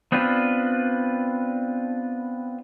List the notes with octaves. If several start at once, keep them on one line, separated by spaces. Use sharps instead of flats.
B3 C4 D4 F4 B4